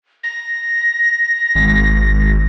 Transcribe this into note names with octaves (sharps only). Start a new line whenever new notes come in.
A#6
G#1